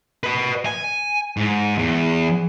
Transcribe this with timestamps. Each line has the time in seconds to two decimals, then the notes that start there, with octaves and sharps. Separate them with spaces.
0.24 B4 D#5
0.66 G#5
1.37 G#2
1.78 E2